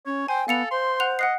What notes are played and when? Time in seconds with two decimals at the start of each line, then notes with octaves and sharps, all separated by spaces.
0.06 C#4 C#5
0.28 C5 G5 G#5
0.48 B3 A4 F5 C#7 F7
0.71 C5 C6
1.00 F#5 F#6 F7
1.19 D#5 F#5 F#6 C7